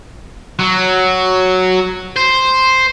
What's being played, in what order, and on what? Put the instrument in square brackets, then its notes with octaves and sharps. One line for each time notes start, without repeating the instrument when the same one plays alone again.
[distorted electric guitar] F#3
C5